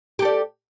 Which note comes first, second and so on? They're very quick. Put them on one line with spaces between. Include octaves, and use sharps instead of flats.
G4 A4 D5